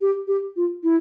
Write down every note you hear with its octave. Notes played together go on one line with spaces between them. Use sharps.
G4
G4
F4
E4